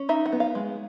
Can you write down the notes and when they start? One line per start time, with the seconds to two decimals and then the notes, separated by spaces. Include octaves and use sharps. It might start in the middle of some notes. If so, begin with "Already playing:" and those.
Already playing: C#4
0.09 D#4 E5
0.26 F#5
0.32 B3
0.40 F5
0.55 G#3